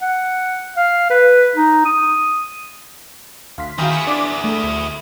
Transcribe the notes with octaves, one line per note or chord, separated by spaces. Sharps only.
F#5
F5
B4
D#4
D#6
D2 F5 C6 B6
D#3 E4 F#4 G#4 F5 G5 A#5
B5 B6 C#7
D4 D5 F#5 D6
A3 A4
D2